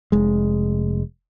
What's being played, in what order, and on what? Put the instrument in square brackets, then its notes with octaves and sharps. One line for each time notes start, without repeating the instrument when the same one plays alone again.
[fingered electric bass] F1 G#3